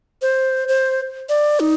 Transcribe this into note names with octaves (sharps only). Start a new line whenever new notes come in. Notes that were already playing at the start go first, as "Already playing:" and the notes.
C5
C5
D5
D#4